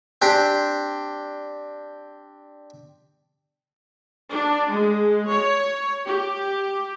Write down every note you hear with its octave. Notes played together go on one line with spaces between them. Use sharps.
C4 D4 G4
D4
G#3
C#5
G4